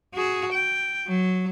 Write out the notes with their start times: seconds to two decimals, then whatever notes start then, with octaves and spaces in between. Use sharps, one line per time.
0.14 F#4 G#4
0.53 G5
1.07 F#3